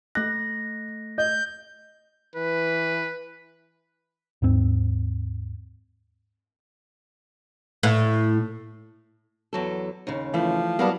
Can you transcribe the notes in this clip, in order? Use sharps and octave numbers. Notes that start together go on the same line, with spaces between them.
A3 F#6 A#6
D#5 G6
E3 B4
D#2 G#2 C4
A2
E2 F#3 A4
D#2 C#3
E3 F3 A3 E4
F#3 G3 A#3 B3 E4 A#4 F5 A5